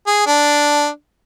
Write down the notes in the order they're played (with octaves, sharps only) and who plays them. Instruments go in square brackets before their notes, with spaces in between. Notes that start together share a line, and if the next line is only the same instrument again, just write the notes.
[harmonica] G#4
D4